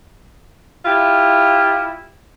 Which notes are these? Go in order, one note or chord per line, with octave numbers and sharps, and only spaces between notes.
E4 F4 G4